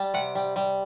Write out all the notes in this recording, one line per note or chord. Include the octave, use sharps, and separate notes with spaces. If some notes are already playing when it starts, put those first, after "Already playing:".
Already playing: G3 A5
C3 F#5
G3
G3